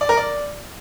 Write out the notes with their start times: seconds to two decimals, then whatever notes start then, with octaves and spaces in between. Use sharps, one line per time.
0.01 D5
0.09 A#4
0.17 D5